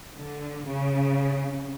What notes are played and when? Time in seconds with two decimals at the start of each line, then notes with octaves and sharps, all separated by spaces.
0.18 D3
0.67 C#3